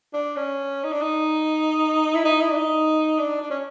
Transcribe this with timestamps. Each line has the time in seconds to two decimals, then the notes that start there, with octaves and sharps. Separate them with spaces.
0.14 D4
0.37 C#4
0.84 D#4
0.92 D4
1.02 D#4
2.15 E4
2.24 D#4
2.41 E4
2.51 D4
2.56 D#4
3.19 D4
3.42 D4
3.50 C#4